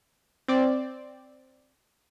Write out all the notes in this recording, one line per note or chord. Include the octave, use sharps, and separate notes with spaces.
C4 D5